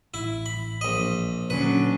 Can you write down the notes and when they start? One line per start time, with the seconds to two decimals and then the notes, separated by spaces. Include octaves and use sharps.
0.14 A1 E4
0.46 B5
0.81 A#1 D#5
1.50 A#2 D3 F#3 C#4 D4 B4